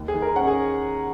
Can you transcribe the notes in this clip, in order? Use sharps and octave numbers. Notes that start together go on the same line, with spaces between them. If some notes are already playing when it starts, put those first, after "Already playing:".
Already playing: D#2
G#4
D#3
A#4
C#4 F#5
G#4